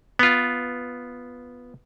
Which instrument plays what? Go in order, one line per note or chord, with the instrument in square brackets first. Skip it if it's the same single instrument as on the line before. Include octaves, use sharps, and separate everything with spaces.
[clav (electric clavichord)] B3 F4